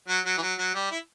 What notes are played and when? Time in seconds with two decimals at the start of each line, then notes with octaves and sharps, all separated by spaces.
0.08 F#3
0.25 F#3
0.38 E3
0.42 F#3
0.58 F#3
0.75 G3
0.92 E4